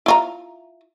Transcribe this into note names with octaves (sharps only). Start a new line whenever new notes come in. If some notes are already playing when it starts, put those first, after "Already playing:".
E4 F4 A#5